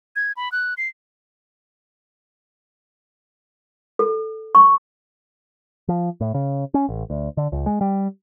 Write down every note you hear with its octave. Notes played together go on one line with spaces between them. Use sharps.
G#6
B5
F#6
C7
A4
C#6
F3
A2
C#3
C#4
A1
D2
D3
C#2
G#3
G3